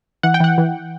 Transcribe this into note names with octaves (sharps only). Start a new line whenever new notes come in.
E3 F#5
G5
E3 F#5
E3